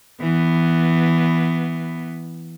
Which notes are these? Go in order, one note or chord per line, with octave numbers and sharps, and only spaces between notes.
E3 B3